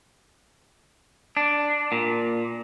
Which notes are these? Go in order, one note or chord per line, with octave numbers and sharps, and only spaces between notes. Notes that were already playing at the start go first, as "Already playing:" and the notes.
D4
A#2